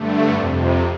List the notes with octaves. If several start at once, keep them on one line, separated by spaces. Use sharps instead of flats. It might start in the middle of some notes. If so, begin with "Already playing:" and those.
Already playing: G2 D3 A3
F2 C3